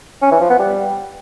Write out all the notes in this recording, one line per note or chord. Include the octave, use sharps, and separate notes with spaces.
C#4
E3
F3
B3
G3